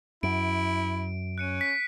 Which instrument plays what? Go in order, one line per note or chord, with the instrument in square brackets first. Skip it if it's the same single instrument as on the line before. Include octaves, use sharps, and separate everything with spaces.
[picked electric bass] F#2 [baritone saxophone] E4 [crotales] D7
[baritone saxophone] C#4 [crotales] F#6 C#7 D#7
[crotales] B6